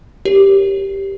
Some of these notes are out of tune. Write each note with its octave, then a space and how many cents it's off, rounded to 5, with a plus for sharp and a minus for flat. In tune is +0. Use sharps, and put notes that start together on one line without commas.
G4 +0 A#4 +0 C#5 -15